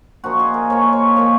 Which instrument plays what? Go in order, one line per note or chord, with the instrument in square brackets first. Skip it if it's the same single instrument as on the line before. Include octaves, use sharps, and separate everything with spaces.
[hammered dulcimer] A#2 F3 A#3 D#4 F#4
G#4
A#4
A#2 F3 A#3 D#4 C#5
C#5
A#2 F3 A#3 D#4 C#5